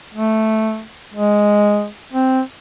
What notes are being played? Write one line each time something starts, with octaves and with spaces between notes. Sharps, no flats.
A3
G#3
C4